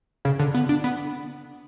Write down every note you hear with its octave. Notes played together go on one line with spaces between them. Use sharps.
C#3
D3
B3
D4
B3